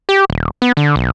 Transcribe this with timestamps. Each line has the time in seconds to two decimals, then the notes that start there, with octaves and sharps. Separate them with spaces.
0.09 G4
0.30 D#1
0.62 B3
0.77 D3
0.96 B1